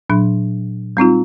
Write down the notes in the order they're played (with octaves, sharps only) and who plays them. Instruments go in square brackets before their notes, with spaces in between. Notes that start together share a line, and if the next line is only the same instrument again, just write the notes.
[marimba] A#2 F#3 D4
G3 C4 D#4 F4